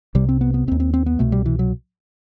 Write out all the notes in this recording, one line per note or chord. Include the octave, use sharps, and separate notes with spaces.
C2 C3 G3
C4
B3
B3
E1 C4
D#2
C4
C4
B3
C2 B2 A3
G3
E3
F#3